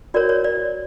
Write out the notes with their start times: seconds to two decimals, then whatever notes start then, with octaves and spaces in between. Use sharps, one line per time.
0.14 F#4 A#4 C#5 D5
0.29 C#5
0.44 D5